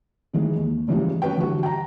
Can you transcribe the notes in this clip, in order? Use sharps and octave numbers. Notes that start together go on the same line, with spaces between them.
D#3 E3 G#3
D#2
G#2 C#3 E3 F3 G3
C#4 F#4 B4 G5
D3 E3 G3 F#4
G5 A#5